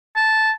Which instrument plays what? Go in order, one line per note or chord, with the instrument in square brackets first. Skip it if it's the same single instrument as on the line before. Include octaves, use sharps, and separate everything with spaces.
[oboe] A5